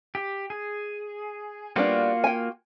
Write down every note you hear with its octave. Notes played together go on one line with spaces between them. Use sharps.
G4
G#4
G3 A#3 B3 D4 F4 F#4
G5 G#5